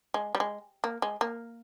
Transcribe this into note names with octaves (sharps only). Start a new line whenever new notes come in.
G#3
G3
G#3
A#3
G#3
A#3